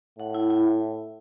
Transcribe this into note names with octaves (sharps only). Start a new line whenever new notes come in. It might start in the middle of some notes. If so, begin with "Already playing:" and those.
A2 F#5
E4
E4